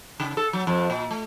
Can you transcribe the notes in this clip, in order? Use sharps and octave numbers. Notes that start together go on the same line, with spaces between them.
C#3
A4
F#3
F2
A#2
A3